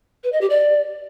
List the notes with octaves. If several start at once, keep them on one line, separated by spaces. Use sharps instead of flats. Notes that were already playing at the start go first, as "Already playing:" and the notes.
B4
D#5
G4
D5